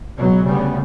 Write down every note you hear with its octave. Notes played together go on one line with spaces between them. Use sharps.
C#2 B2 F#3
D2 C#3 G3 B3